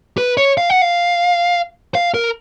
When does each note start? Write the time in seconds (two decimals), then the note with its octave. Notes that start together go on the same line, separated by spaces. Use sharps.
0.18 B4
0.37 C#5
0.58 F5
0.70 F#5
0.82 F5
1.95 F5
2.14 A#4